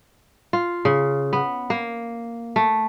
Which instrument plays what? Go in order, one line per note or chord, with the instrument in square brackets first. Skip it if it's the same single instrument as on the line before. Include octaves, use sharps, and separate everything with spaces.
[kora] F4
C#3
B3
A#3
A3